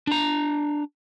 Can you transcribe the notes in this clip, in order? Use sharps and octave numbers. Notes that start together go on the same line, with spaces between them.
D4 A#5